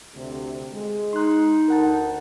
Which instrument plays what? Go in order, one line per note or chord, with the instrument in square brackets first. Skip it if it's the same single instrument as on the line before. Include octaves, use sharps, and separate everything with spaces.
[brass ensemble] D2 C3
G#3
[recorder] D#4 [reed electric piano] C6 F#6
[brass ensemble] D2 [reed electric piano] A#4 F#5 A5